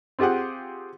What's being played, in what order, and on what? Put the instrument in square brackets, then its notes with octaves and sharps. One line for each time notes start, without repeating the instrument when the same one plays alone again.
[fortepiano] C4 F4 G4 G#4 F#5